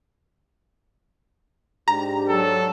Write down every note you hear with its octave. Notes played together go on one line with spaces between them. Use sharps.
G#2 D4 G4 A#5
F#3 A4